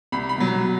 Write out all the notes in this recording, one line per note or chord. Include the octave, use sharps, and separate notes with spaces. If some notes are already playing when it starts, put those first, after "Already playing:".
C2 B5
B5
B2 F#3
A#5